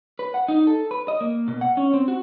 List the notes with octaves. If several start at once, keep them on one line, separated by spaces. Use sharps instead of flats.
B4
F#5
D#4
A4
B4
D#5
A#3
B2
F#5
C#4
C4
F#4